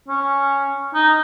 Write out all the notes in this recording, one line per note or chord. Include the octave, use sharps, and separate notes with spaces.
C#4
D#4